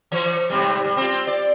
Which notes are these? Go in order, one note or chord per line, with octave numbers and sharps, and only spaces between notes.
E3 C#5
G#2 C3 G3
G3
C4 F4
D5